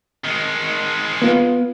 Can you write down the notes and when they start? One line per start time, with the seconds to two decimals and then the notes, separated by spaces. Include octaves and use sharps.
0.25 D#3 G#3
1.22 B3 F4